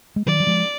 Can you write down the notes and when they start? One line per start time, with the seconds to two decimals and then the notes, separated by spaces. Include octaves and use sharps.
0.16 G#3
0.26 D#3 F#3 D5
0.40 F#3
0.47 F3 G#3